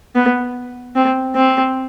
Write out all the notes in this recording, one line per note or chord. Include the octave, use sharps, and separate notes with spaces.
B3
C4
C4